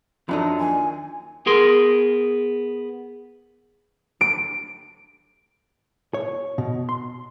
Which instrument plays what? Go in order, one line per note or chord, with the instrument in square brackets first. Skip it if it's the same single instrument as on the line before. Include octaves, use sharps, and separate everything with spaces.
[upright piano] F#2 F#3 A4 [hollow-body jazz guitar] F3 D4 D#4
[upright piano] D#2 [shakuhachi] G#5
[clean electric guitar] B3 G#4 A#4 C6
[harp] D7
[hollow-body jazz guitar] C#5
B2
C6